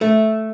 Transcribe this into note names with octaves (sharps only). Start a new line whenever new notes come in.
A3